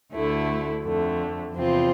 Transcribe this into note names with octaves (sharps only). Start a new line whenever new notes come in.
D2 D3 A3 E4
F2 D3 A3
E2 C3 F3 C4 F4